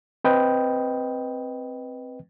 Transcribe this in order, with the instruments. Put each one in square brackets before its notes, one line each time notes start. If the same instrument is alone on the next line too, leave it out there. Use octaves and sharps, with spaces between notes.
[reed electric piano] C4 B4 D#5 G5